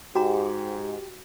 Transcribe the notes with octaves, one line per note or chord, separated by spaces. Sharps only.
G#2 F#4 G4 A#5